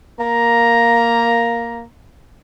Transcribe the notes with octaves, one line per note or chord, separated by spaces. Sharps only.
A#3 A#5